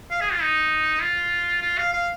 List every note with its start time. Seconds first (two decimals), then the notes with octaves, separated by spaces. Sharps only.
0.11 F5
0.21 G#4
0.32 F4
0.42 D#4
1.02 F4
1.62 F4
1.78 F5
1.93 F5